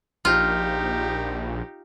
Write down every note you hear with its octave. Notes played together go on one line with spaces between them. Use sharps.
A#1 D#4 F4 G4